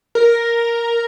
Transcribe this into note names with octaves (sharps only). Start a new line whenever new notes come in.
A#4